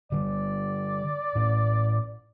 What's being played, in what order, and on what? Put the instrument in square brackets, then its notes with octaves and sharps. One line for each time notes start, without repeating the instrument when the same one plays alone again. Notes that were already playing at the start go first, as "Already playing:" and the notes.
[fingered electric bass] D3 G3 [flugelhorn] D5
[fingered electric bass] A2 C#4